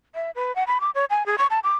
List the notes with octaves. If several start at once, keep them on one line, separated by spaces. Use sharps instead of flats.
E5
B4
F#5
B5
D6
C#5
G#5
G#4
C#6
A5
D6